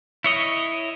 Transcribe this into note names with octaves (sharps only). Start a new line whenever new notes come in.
E4 C#5 D#5